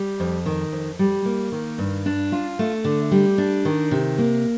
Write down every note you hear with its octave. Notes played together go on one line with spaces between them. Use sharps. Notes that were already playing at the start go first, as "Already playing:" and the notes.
Already playing: G3
F2
D#3
F2
G3
A#3
D#3
G2
D4
F4
A3
D3
G3
D4
D#3
C3
A#3